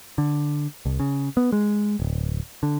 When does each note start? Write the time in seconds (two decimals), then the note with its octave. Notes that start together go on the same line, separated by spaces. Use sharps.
0.18 D3
0.86 C2
1.00 C#3
1.37 B3
1.52 G#3
2.00 D1
2.63 D3